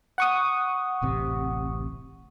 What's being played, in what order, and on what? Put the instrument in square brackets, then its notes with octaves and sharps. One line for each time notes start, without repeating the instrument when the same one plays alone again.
[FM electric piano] F#5 C#6 D#6
[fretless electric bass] D1 A1 C3